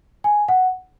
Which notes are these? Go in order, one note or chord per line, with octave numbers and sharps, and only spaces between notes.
G#5
F#5